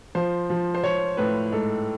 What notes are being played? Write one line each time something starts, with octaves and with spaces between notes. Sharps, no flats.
F3 C5
F3
C5
F3 C#5
A2 B4
G#2 A4